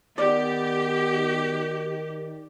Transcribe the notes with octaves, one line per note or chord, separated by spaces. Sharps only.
D#3 B3 G4 D5